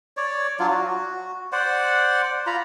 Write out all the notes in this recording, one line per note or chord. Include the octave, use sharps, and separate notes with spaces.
C#5 D5
F#3 D4 F4
F#4
C5 D5 F#5
F4 A#5 B5